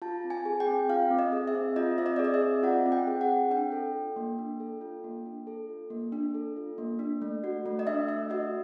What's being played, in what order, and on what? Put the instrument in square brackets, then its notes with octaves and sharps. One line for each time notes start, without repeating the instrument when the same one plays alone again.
[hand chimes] F4 A5
C4
G#5
G#4
G5
C4
F4 F5
C4
D#5
G#4
E5
C4
F4 D#5
C4 E5
D#5
G#4 D5
D#5
E5
C4
F4 F#5
C4
G5
G#4
F#5
C4
D4 G5
A4
F4
A#3
D4
A4
F4
A#3
D4
A4
F4
A#3
D4
A4
F4
A#3
D4
A3
F#4
A3
D#5
D4 E5
A3 E5
F#4 D#5